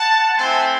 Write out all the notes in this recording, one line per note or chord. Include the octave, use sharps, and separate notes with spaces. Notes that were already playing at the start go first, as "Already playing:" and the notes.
Already playing: F#5 A5
A3 C4 E4 G#5 C6